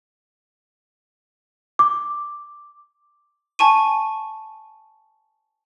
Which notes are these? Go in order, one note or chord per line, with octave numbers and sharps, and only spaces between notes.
D6
G#5 A5 C#6 D#7